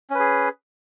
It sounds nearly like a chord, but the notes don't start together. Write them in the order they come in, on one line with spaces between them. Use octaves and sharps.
C#4 B4 G#4